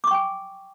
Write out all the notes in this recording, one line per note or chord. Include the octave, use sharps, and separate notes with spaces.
G5 G#5 C#6 D6